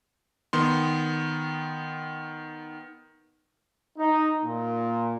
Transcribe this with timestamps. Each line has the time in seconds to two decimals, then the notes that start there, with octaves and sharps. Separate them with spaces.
0.53 D#3 B3 C6
3.98 D#4
4.43 A#2